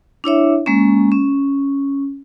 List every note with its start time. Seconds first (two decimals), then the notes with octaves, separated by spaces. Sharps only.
0.24 D4 E4 C#5 E5
0.66 G#3 A#3 C#4
1.12 C#4